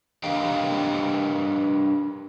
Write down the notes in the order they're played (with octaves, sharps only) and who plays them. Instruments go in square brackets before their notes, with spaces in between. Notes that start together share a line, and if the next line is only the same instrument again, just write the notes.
[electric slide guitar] D4 G4 A#4 D#5 F5 G5